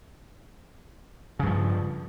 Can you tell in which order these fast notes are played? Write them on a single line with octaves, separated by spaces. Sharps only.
C#3 G2 F3